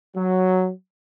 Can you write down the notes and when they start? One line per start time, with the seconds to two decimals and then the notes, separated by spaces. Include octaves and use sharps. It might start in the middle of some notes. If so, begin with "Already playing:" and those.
0.16 F#3